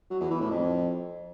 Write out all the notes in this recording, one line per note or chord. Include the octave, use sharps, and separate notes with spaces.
F#3
E2
E3
A2
F2